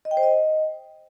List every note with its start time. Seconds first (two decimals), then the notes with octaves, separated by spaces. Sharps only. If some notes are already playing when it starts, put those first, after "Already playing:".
0.05 D#5
0.11 G5
0.17 C5
0.23 D#5